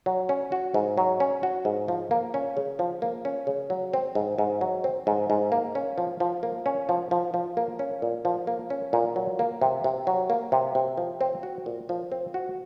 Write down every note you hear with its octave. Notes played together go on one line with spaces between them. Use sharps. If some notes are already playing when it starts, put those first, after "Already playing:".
F#3
C#4
F#4
G#2
F#3
C#4
F#4
G#2
F3
A#3
C#4
C#3
F3
A#3
C#4
C#3
F#3
C4
G#2
G#2
F#3
C4
G#2
G#2
A#3
C#4
F3
F3
A#3
C#4
F3
F3
F3
A#3
C#4
A#2
F3
A#3
C#4
A#2
F#3
A#3
C3
C3
F#3
A#3
C3
C3
F3
C4
F#4
A#2
F3
C4
F#4